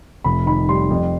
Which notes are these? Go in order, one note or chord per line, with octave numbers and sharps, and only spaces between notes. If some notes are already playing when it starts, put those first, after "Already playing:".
F1 B5
D#3 B5
G3 C6
F2